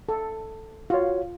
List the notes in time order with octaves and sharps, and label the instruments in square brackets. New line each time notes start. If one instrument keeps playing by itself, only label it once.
[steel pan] A4
[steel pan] F4 [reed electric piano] F#4 C#5